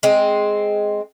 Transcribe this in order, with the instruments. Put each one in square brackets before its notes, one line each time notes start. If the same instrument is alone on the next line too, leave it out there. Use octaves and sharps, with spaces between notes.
[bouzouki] G#3 C4